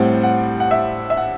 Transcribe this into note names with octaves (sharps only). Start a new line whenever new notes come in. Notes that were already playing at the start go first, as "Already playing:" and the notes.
Already playing: A2 G3 C4 F#5
F#5
F#5
E5
E5
F#5